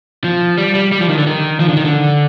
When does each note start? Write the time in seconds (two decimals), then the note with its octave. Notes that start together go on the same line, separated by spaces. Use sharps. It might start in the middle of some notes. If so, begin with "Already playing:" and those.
0.24 F3
0.58 G3
0.75 G3
0.92 G3
1.01 F3
1.09 D#3
1.18 D3
1.26 D#3
1.60 F3
1.69 D3
1.77 D#3
1.85 D3